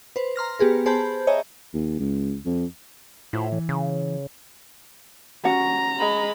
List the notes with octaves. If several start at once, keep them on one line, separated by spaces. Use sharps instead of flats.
B4 C5
A#5 C6 F6 A#6
B3 G4 G#4 B4
G#4 C5 A5 B5 G6
C#5 D#5 E5 G#5 A#5
D#2
C#2
F2
A2 E4 F4 C5
E3
C#3
C#4 F#4 F#5 A#5
G#3 B5